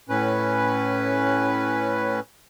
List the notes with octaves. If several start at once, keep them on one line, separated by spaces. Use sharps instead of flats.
A2 C#4 B4